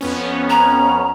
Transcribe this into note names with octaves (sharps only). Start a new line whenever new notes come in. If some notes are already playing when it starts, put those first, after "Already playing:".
F2 B3 C#4
A#5